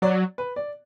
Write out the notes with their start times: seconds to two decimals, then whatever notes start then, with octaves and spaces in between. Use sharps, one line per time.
0.02 F#3 D5
0.38 B4
0.56 D5